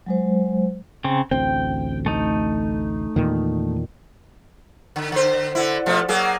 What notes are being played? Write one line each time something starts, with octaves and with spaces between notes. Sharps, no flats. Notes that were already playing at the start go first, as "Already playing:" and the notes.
F#3 G#3 C5
C#3 C4
A1 D2 C4 G5
A3 D#4
E2 A#2 D#3
D3
D3 C5
D3 E4
B2 F3 A3
F#3 A#3 G#4